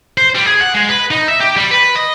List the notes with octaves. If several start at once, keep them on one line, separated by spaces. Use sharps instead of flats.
C5
G3
G#4
F#5
G#3
B4
D#4
E5
G4
G3
B4
D#5